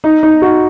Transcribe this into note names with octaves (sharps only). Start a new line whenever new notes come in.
D#4
D#4
F#4